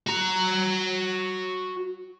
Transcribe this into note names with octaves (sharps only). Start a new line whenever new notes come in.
F#4 A#5